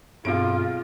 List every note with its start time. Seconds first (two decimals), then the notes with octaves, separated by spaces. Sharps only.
0.25 B1 G2 C4 F4 G#4 D7